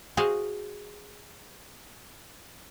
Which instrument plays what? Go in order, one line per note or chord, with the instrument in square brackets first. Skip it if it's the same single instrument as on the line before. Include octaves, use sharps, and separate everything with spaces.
[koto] F#4 G#4 C5 D#5 F5